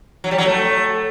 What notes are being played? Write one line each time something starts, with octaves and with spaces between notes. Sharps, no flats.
F#3
G3
F#3
A3